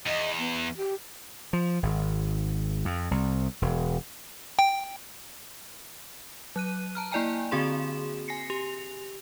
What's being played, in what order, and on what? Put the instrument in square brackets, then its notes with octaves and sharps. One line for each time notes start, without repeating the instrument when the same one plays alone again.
[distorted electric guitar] E2 [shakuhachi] D#5
[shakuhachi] B3
G4
[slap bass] F3
G#1
F2
C2
E1
[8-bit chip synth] G5
[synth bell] F#3 F#6 D#7
A5 A#5 F6
A#3 E4 D5 G5 G#5 A#5
D3 C4 F#4 G#4 C6 E7
G#5 A#6 C7 C#7
G4 F7